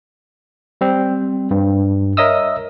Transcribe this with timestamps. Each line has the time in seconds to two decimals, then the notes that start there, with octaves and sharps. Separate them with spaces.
0.81 G3 C4
1.51 G2
2.17 A#4 C#5 D#5 E5 D#6 E6